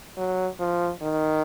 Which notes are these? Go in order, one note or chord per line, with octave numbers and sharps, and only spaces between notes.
F#3
F3
D#3